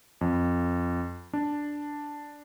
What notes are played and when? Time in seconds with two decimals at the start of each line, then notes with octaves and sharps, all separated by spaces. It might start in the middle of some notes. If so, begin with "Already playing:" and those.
0.21 F2
1.33 D4